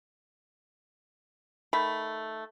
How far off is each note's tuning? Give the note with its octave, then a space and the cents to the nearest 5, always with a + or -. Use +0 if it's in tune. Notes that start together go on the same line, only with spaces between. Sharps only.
D#3 +0 A3 +0 B5 +0